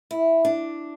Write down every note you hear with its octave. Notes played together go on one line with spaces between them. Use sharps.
E4
D4